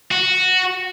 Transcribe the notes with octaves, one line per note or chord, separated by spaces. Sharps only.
F#4